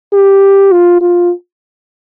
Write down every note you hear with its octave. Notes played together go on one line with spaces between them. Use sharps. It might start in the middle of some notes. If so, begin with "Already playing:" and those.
G4
F4
F4